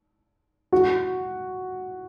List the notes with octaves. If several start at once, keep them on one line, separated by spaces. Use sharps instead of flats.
F#4